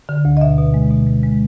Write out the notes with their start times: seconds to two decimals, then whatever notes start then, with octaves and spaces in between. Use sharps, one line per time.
0.09 D3
0.25 D2
0.37 D#5
0.41 B2 E5
0.58 B2
0.74 G#3
0.90 B2
1.07 G#3
1.23 G#3